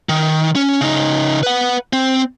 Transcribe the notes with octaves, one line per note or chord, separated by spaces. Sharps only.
D#3
C#4
C#3 D#4
B4 F#5
C4